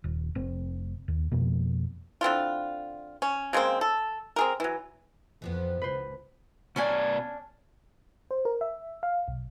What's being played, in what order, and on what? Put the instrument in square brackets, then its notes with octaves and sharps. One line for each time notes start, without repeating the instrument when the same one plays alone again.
[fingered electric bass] D#1
F1 C4
D#2
F2 B2 F3 A#3
[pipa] D3 C4 E4 F4
C#4
C#3 G#3 A#3 C4
A4
C4 G#4 A#4
E3 F#3
[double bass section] F2 [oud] E3 F3 B3
[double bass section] C#2 [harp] B4 C5
[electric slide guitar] B2 B3 D5 [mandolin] C#4 D4 G#5
[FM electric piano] C5
A#4
E5
F5
B1